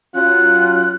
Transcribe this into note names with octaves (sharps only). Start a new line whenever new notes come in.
F#3 C#4 F4 F#6